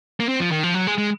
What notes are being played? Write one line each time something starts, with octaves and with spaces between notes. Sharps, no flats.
A#3
C4
F3
D#3
F3
F#3
G#3
G#3